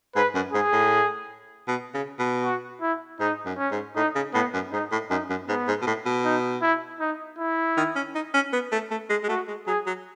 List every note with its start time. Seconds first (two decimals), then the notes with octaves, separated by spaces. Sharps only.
0.16 G#2 B4
0.35 F#2
0.53 G#2 G#4
0.72 A2
1.68 B2
1.94 C#3
2.19 B2
2.45 F#4
2.82 E4
3.20 G#2 D#4
3.46 F#2
3.58 C#4
3.71 G#2
3.96 A2 D#4
4.15 C#3
4.34 A2 B3
4.54 F#2
4.72 G#2 D#4
4.91 A2
5.10 F#2 D#4
5.30 F#2
5.48 G#2 B3
5.67 G#2
5.82 B2
5.87 A2
6.06 B2
6.25 D#4
6.62 E4
7.00 D#4
7.39 E4
7.77 D#3
7.96 C#4
8.15 D#4
8.34 C#4
8.53 B3
8.72 A3
8.91 A3
9.10 G#3
9.23 G#3
9.29 A3 F#4
9.48 G#3
9.67 F#3 G#4
9.86 F#3